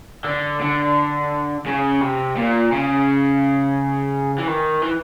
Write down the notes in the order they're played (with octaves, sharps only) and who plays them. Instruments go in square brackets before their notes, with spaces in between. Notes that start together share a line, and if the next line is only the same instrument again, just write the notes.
[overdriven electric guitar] D3
D3
C#3
C3
A#2
C#3
E3
D#3
E3